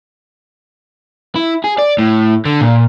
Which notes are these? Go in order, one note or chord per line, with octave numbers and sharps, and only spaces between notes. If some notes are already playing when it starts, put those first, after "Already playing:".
E4
G#4
D5
A2
D3
A#2